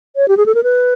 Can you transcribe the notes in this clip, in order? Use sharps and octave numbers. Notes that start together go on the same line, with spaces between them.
C#5
G4
G#4
A4
A#4
B4